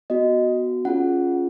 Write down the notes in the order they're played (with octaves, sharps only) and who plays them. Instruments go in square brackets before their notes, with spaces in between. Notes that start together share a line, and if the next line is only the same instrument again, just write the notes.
[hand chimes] B3 F#4 D#5
C#4 F4 G#4 F#5